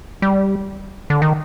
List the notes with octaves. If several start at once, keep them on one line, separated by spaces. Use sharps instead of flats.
G3
D3
D#3